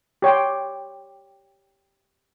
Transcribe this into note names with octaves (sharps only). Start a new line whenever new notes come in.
G4 C#5 G5 C6